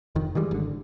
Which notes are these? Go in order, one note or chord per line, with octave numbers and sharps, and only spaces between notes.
F1 F2 D#3
D#3 E3 G3 G#3
G#1 D3